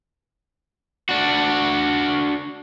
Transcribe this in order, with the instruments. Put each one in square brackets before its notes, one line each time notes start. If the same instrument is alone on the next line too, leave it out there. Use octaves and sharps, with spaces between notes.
[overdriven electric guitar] D4 F#4